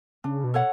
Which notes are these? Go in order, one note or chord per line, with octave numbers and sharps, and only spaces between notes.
C#3 D4
B2
A4 C#5 F#5